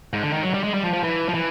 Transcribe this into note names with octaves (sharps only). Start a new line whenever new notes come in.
G#2
D3
D#3
F#3
G3
G#3
G3
F3
F3
E3
F3
E3